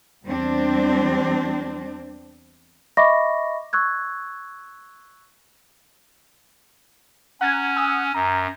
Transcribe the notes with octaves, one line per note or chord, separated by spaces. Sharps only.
E2 G3 C4 D4
D#5 E5 B5 C#6 D6 A#6
C#6 E6 F#6 G#6
C#4 F#5 A#5 G#6
G#5 D#6 E6
F#2 A#5